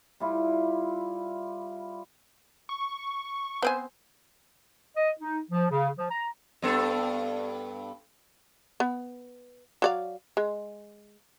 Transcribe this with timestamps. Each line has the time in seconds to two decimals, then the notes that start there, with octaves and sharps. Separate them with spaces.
0.20 G3 E4 F4
2.69 C#6
3.62 B3 C4 C5 G#5
4.96 D#5
5.20 D#4
5.51 F3
5.70 C#3
5.98 F3
6.11 A#5
6.62 G2 B3 A4
8.80 B3
9.82 F#3 D5 F5
10.37 G#3